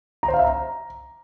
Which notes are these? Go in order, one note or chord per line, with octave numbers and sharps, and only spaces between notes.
A#5
C5
F5
E5
A#5